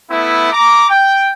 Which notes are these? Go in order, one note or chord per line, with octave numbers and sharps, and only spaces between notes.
A3 B3 E4
A#5 D6
G5